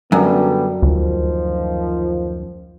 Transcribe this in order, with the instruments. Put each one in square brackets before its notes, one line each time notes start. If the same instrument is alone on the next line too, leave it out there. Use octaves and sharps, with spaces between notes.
[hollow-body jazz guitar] F#2 [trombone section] D3 G3 B3
[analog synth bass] D2 [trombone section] D#3 F3